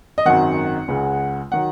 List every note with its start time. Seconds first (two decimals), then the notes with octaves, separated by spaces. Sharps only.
0.18 D#5
0.26 G#1 F#2 D#3 F#5
0.88 C#2 C#3 G#3
1.52 D#3 F#3 F#5